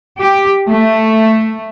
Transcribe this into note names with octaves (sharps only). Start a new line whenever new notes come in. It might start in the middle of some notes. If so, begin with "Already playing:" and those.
G4
A3